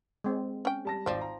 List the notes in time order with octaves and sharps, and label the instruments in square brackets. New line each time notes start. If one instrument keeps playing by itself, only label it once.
[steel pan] G#3 C4
[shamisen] C#4 G5
[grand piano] G3 A5 A#6
[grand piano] G#1 D5 [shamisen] F3 C4
[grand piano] A#5